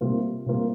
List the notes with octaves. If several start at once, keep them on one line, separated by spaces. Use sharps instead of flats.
C3 G3 A#3 F4
C3 G3 A#3 F4